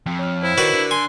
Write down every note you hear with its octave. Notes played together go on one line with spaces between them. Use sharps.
F2 B6
C#5 F6
E4 C5
D#3 F#4 A#4 B4 D5
D3
G#5 C6